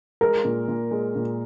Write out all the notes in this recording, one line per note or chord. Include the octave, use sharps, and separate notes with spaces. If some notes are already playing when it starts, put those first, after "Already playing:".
G#3 A#4
A#2
A#2
G#3
A#2